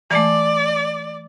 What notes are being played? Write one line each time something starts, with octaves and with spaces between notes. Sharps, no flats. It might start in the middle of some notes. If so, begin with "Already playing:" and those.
E3 G#3 A3 D5